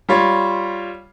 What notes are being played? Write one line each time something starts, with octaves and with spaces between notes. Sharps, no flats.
G3 F4 C#5